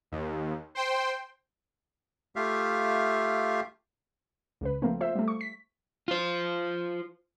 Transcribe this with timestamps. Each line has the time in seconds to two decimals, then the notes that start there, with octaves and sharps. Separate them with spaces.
0.12 D#2
0.75 C5 G5 C6
2.36 A3 F4 G4 E5 F5
4.61 C#2 C#3 B4
4.82 F3 A3 A#3 C4
5.01 F4 C5 E5
5.15 G3 A3
5.28 C#6
5.41 B6
6.08 F4 C5